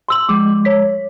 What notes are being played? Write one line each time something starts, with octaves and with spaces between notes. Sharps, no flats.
C6 E6 F#7
F3 G#3 D6
C#5 B6